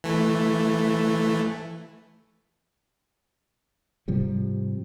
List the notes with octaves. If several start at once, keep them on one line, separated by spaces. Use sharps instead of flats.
E3 A3
G#2 C3 F3 G3